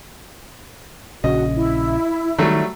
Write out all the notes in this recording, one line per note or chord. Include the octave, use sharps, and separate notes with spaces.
A#1 C#3 F#4 D#5
E4
D#3 F#3 G3 A3